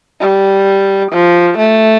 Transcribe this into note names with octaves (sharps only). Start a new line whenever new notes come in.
G3
F3
A3